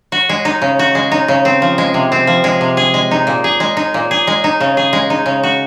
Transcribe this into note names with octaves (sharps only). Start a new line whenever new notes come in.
F#4
G#3
D#4
C#3
F#4
G#3
D#4
C#3
C4
F3
G#3
C3
C4
F3
G#3
C3
G#4
G#3
D#4
A#2
G#4
G#3
D#4
A#2
G#4
G#3
D#4
C#3
G#4
G#3
D#4
C#3
F#4